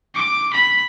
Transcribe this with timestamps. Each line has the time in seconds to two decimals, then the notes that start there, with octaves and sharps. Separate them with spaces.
0.15 D6
0.54 B5